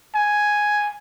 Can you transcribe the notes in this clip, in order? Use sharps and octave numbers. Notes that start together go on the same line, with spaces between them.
G#5